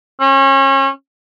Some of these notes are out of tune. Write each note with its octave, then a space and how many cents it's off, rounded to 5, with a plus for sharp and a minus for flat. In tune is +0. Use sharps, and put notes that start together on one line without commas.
C#4 -30